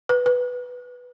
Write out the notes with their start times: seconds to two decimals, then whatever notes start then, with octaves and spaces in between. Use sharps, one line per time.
0.09 B4
0.26 B4